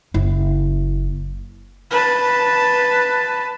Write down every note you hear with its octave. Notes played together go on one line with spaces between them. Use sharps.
F#1 E4
B4 A5